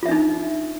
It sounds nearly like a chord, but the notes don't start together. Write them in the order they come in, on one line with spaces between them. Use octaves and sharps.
F4 E5 D4 D#4